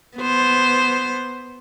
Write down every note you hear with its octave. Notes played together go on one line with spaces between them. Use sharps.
B3 C5